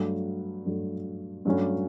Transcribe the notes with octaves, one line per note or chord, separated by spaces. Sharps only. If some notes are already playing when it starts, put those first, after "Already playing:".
Already playing: G2 F#3 A3
G2 F#3 A3
G2 F#3 A3 C#4